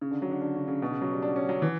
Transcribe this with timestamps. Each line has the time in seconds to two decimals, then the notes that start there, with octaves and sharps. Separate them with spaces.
0.01 C#3
0.11 D3
0.22 F#3
0.31 D3
0.42 D3
0.55 C#3
0.68 C#3
0.82 B2
0.91 C#3
1.01 F#3
1.12 G3
1.22 D4
1.36 C#4
1.49 F#3
1.62 E3